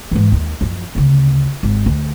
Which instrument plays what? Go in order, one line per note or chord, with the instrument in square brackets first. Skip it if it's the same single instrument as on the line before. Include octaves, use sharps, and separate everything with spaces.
[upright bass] G#2 E3
D#2 D#3
F#2 F3
D2 C#3
G#1
D2